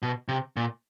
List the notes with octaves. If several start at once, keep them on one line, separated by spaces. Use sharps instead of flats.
B2
C3
A#2